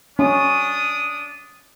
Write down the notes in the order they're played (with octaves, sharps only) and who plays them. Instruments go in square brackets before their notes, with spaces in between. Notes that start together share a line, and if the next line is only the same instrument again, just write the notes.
[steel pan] C#4 [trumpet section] D4 D#6